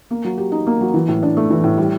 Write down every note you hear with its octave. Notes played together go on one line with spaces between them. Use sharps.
A#3
F#3
G4
D#4
A#3
F#3
E3
A2
D4
A3
E3
A2
G3